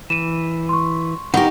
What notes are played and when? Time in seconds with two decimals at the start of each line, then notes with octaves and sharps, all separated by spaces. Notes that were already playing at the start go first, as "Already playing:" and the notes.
0.10 E3 D#7 E7
0.69 C6 C#6
1.34 D3 B3 D#4 G4 A#4 F#5 C#6